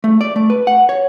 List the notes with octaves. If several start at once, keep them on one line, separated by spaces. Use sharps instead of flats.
A3
D5
A3
B4
F#5
C#5